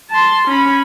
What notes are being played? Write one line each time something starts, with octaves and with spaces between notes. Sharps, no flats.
A5 C6
C#4 B5